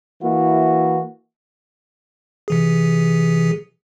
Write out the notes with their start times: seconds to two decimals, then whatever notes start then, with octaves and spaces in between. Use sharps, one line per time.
0.21 E3 A#3 E4 F#4
2.48 C3 E3 G#4